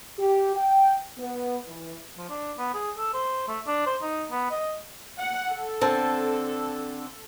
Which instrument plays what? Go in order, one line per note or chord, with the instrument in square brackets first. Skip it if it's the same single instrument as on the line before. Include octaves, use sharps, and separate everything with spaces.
[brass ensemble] G4
G5
B3
E3
[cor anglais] F3
D4
B3
G#4
A4
C5
A3
D4
C5
D#4
B3
D#5
[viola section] F#5
A4
[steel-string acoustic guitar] D3 C4 A5